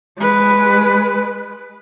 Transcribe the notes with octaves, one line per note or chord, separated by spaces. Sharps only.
G#3 B4